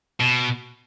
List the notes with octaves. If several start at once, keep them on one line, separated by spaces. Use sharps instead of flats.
B2